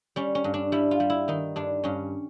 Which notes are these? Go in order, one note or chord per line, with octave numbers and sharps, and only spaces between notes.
G3 C#4
C#4
G2
D4
G3 E4
F4
G3
E4
D#3 D#4
G2 D4
G2 C#4